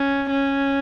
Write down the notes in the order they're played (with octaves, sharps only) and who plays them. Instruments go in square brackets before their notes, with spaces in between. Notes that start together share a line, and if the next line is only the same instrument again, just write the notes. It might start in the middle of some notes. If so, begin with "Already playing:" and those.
Already playing: [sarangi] C#4
C#4